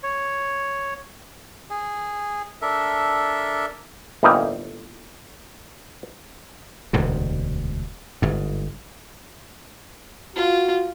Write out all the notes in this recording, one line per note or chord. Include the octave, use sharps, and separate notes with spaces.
C#5
G#4
D4 A4 A#4 E5
G1 A2 E3 A#3 D#4 G5
E1 D2 G#2 C3
G1 G#2
F4 F#4